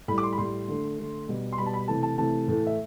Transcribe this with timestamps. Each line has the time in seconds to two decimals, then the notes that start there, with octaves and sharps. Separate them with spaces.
0.08 A2 G3 B5
0.18 D6
0.23 C6
0.32 B5
0.38 A2 G3 C6
0.68 D3 A3
0.98 D3 A3
1.28 B2 G3
1.52 C6
1.58 B2 G3 B5
1.66 A5
1.73 B5
1.88 C3 E3 A3 A5
2.03 A5
2.18 C3 E3 A3 A5
2.48 A2 E3 A3
2.67 E5